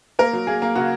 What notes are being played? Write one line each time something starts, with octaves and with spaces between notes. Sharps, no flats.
A#3 A#4
F#3
A#3 G#4
A#3
C#3 F#4